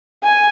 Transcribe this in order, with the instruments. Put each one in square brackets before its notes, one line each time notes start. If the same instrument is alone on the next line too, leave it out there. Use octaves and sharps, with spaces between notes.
[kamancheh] G#5